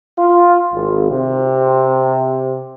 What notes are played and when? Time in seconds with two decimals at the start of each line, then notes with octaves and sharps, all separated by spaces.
0.19 F4
0.74 G#1
1.10 C3